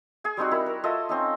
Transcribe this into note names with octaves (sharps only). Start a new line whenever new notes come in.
G#4 G#5
G3 C4 D#4 F#4
E4 A#4 B5
A#4
F4 A4 D#5 E5
C4 C#4 D#4